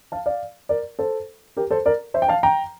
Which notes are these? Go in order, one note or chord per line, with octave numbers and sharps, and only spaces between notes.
F5 A5
D5 F5
A#4 D5
A4 C5
G4 A#4
A4 C5
A#4 D5
C5 E5
G5
F5 A5
G5 A#5